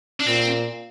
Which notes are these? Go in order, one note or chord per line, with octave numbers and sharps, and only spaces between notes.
D4
A#2 C4